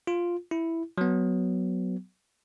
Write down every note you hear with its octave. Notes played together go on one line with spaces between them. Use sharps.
F4
E4
F#3 B3